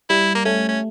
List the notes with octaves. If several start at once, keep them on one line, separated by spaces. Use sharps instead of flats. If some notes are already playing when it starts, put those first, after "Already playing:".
G3 E4
A#3
A3 C#4
C#4